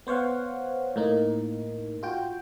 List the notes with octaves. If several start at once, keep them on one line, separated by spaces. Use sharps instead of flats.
B3 C5 C#5 F5 F#5
A2 A#3 D#4
F4 F#4 G5